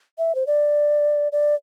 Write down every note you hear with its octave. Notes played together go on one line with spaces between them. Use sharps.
E5
C5
D5
D5